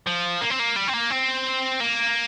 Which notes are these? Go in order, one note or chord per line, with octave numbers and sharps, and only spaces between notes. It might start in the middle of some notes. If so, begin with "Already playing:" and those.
F3
A#3
C4
A#3
G3
C4
A#3
C4
A#3